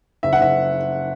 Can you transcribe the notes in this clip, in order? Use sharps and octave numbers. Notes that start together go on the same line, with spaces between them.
F#1 E5
F#5
F#1 E5